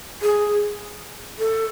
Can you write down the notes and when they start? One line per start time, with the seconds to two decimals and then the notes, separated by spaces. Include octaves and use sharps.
0.22 G#4
1.39 A4